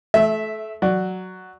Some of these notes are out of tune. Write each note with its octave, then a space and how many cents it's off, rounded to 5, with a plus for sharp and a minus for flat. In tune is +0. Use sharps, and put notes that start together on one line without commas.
A3 -25 E5 +0
F#3 +0 D5 +0